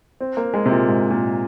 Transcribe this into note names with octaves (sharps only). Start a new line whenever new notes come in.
C4
A#3
G#3
C3
A#2
G#2
A#2